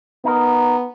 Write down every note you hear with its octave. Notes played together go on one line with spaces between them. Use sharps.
B3 D#4 A#4